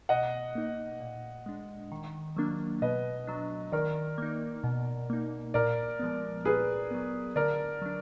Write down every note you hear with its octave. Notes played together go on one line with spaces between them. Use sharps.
B2 D#5 F#5
A#3 D#4
A#2
G#3 D4
D#3
F#3 A#3 D4
B2 B4 D#5
F#3 D4
D#3 A#4 D5
A#3 D#4
B2
A#3 D#4
A#2 A#4 D5
F3 G#3 B3
A#2 G#4 B4
F#3 B3
D3 A#4 D5
F#3 D4